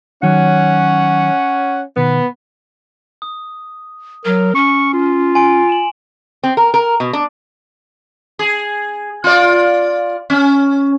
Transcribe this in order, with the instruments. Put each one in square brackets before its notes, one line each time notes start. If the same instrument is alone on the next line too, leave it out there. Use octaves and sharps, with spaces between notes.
[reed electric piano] D#3 F#3 [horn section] C#4 F#5
[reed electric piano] B2 D#3 [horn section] B3
[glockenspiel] D#6
[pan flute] F#3 [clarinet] A#4
[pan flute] C#4 [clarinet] C#6
[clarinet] F4
[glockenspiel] G#5 C6 D7
E7 F#7
[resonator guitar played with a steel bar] C4
A#4
A#4
B2
D4
[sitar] G#4
F4 D5
C#4